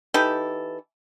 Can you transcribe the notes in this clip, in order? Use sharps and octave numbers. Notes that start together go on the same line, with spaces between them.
E3 D#4 G4 A4